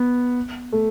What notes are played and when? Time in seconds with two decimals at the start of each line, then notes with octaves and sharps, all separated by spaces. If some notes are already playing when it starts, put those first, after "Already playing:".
Already playing: B3
0.72 A3